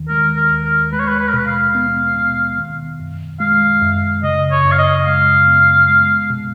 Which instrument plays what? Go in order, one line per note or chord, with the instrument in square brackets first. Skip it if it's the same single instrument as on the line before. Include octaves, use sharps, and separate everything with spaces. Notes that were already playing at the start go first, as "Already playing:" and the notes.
Already playing: [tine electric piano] D#2 D#3
[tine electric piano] G#3 [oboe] A#4
[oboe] A#4
[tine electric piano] D#2
[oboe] A#4
[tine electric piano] G#3 [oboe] B4
[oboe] C#5
B4
B4
A#4
[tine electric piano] B2 [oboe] B4
[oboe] F5
[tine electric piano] B3
B2
D#3
F#2
[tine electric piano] G#3 [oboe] F5
[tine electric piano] F#2
[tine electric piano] C#3 [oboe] D#5
[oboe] C#5
[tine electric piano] F#2
[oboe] F5
D#5
[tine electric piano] G#3 [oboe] F5
[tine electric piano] B3
G#3
B2